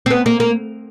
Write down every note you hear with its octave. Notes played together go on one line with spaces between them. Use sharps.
C4
B3
A#3
A#3